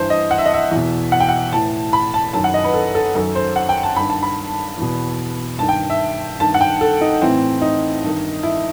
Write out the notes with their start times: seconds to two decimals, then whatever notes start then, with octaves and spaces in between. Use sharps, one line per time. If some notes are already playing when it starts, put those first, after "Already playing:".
Already playing: G2 E3 C5
0.10 D#5
0.31 F#5
0.38 E5
0.46 D#5
0.54 E5
0.71 E2 B2
1.12 F#5
1.20 G5
1.29 F#5
1.52 A2 E3 A5
1.93 B5
2.14 A5
2.33 F#2 D#3 A5
2.44 F#5
2.54 D#5
2.64 B4
2.74 A4
2.95 A4
3.15 F#2 D#3 A4
3.35 C5
3.56 F#5
3.69 G5
3.83 A5
3.96 G2 D#3 B5
4.10 A5
4.23 B5
4.78 E2 B2
5.59 G2 A5
5.63 D#3
5.69 G5
5.90 E5
6.40 G2 D#3 A5
6.54 F#5
6.61 G5
6.81 A4
7.01 D#4
7.21 A2 E3 C4
7.62 D#4
8.02 G2 D#3
8.43 E4